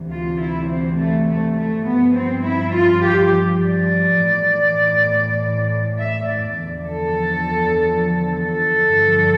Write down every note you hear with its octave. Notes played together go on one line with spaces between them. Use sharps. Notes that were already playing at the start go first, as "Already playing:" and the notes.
Already playing: D2 C3 E3
F4
E4
C4
A3
A3
A3
G2 F3 B3
C4
E4
F4
G4
D5
A2 E3
E5
D5
E2 D3 F3
A4
A4
G2 D3 F3